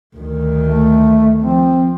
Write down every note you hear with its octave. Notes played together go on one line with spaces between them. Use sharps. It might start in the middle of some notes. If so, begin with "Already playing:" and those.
D2 D#3
A3
F3 C4